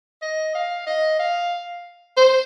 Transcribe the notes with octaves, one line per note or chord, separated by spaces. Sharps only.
D#5
F5
D#5
F5
C5